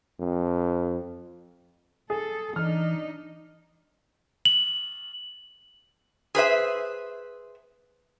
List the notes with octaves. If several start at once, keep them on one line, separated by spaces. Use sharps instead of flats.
F2
G#4 A4
E3 D4 D#4 F6
F#7
G#4 B4 C5 E5